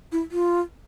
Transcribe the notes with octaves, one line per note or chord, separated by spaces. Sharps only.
E4
F4